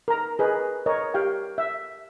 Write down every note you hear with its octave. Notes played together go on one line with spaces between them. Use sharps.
A#4 A#5
G#4 B4 D#5
A#4 C#5 D#5
G4 F5 G5
E5